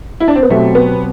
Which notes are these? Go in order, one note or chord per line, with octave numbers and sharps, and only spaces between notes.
E4
D4
C4
B3
B2 F#3 A3 C4 G4 C5
B3